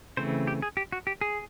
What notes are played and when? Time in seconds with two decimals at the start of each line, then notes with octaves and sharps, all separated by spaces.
0.17 C#3 E3 A3 C4 C5
0.47 G4
0.62 G#4
0.77 G4
0.92 F#4
1.07 G4
1.21 G#4